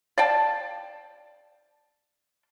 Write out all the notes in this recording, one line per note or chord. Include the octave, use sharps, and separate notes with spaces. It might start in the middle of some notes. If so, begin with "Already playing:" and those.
D5 F5 G5 A5